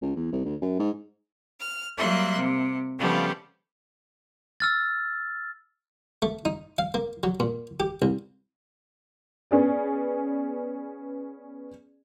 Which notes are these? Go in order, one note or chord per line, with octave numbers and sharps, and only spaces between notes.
C#2
E2
C2
D2
F#2
G#2
F6
F#3 G3 A#3 E5 C6 F#6
C3
C#3 F3 G3 A3 B3
E6 F6 A6
A3
D#4
F5
A#3
F#3
A#2
G4
C2
B3 C#4 G#4 D5